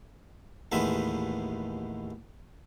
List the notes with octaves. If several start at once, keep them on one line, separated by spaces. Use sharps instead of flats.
A1 D#2 G#3 B3 E5